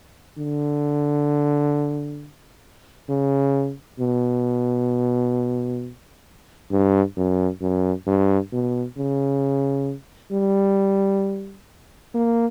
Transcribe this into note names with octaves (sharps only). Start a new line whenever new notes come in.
D3
C#3
B2
G2
F#2
F#2
G2
B2
C#3
G3
A#3